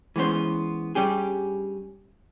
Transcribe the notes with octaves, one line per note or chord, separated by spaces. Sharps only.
E3 G#3 B3 C#4 C5
G2 G3 C#4 G4 G#4